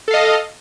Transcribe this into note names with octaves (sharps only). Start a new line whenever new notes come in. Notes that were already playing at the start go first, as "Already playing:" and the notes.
A4 D#5 F5